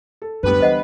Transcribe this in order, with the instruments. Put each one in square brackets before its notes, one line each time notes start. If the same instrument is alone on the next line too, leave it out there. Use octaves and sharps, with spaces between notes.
[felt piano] A4
[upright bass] D1 F#2 [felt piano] D3 G3 B3 [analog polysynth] B4
[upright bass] E3 [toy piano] C5 D#5 F#5